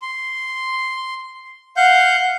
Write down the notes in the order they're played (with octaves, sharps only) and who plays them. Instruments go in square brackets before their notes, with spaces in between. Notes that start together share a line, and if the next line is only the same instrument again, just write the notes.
[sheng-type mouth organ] C6
F5 F#5 G6